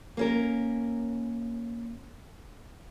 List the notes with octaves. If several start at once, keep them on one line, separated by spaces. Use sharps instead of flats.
A#3 C#4 A#4